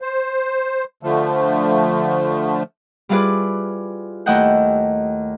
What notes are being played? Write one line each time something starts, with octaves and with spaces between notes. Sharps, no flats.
C5
D3 F3 A3
G3 E4 F4 G#4 B4 D5
D#2 A3 E4 D#5 F#5 G5